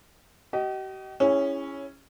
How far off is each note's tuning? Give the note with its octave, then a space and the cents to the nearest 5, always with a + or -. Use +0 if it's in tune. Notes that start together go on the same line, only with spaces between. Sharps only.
G4 -45 D#5 +0
C#4 +0 E4 +0 G#4 -35